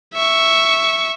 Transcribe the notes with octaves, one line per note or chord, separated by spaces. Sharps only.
E5 C#6